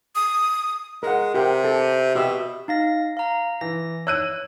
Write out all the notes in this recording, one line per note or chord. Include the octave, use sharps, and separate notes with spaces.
D#6
G#3 A#4 F#5
C3 G4 A#4 G5
A4
B2 G4 E5
D#4 F5 A#6
F5 A#5
E3 A#6
C#5 E6 F#6 D#7